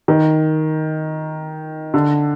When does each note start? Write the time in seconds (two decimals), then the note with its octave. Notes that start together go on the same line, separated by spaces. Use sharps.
0.08 D#3
1.94 D3